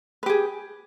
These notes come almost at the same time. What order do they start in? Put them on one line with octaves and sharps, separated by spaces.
B4 G4 G#4